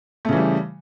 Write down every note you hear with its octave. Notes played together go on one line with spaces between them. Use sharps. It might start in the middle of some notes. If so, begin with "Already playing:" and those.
C#3 E3 G3 A3